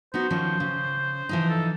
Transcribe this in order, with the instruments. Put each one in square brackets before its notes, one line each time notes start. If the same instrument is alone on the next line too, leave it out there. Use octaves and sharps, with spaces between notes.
[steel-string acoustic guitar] B3 D#4 F#4 [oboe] C5
[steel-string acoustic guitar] D#3 F3 C#4
C#3
E3 F3 D#4
[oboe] A4